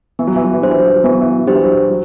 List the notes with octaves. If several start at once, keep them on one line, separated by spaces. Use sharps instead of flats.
E3 B3
F#3
E3
F#3
E3
F#3 D4 G4 C5
E3
F#3
E3
F#3
E3 B3
F#3
E3
F#3
E3
F#3 D4 G4 C5
E3
F#3
E3
F#3